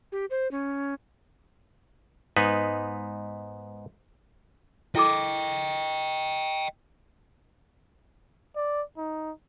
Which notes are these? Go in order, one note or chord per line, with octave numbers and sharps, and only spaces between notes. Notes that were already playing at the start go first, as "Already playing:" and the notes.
G4
C5
C#4
G#2 B3 D#4 B4
E4 A4 D#5 G5 D6
D5
D#4